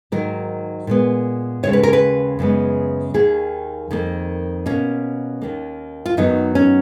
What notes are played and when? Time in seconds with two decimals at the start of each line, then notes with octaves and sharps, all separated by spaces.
0.12 G#2 D#3 F#3 A#3 A#4
0.87 A#2 G#3 B3
1.63 D#2 C#3 G#3 C#5
1.73 B4
1.83 A#4
1.93 B4
2.39 F#2 C#3 G#3 B3
3.14 D#2 D#3 A#3 G#4
3.91 F2 D#3 A#3
4.66 B2 A#3 C#4
5.42 D#2 D#3 A#3
6.06 F4
6.17 F#2 D#3 F#3 B3 D#4
6.55 C#4